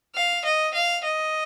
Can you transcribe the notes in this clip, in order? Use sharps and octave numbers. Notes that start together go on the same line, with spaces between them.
F5
D#5
F5
D#5